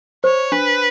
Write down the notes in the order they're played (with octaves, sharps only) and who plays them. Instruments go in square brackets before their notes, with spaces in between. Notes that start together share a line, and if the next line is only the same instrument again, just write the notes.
[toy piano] C5 [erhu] C#5
[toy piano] D4 [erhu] B4